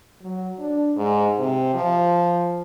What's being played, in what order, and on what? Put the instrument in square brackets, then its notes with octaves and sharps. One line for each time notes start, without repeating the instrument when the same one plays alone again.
[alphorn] F#3
D4
G#2
C3
F3